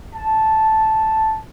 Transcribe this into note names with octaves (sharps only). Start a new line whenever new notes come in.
A5